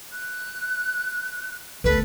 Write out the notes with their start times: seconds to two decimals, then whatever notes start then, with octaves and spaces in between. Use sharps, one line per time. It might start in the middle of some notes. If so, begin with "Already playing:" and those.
0.12 F#6
1.84 G1 D2 A4 B4